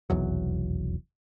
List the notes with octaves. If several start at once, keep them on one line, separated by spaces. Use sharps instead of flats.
F1 B1 E2 F#3